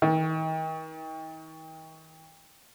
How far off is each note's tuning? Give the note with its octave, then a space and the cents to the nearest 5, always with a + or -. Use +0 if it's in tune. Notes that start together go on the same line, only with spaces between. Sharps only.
D#3 +40